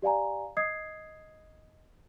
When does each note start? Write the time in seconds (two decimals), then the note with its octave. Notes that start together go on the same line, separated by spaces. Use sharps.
0.02 G4 D5 F5 G#5 A#5
0.57 D#5 D#6 G#6 C7